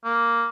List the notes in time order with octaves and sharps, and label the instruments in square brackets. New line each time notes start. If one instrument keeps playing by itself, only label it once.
[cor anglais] A#3